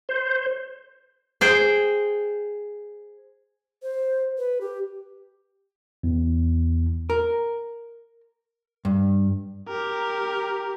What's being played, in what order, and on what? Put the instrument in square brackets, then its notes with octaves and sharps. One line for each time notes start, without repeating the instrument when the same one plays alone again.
[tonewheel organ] C5
[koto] G#4 C5 G5
[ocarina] C5
B4
G4
[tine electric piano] E2
[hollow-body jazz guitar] A#4
G2
[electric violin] G4 A#4